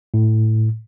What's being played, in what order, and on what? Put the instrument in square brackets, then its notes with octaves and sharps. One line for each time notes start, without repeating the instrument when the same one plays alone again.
[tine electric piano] A2